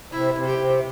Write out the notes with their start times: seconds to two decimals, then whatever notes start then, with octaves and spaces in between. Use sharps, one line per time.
0.12 C3 E4
0.34 C3
0.47 G4
0.58 C3